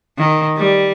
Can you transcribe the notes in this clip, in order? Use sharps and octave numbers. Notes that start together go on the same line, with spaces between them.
D#3
G3